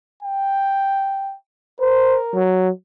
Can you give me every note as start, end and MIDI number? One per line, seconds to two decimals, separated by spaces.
0.23 1.35 79
1.80 2.42 70
1.80 2.18 72
2.35 2.70 54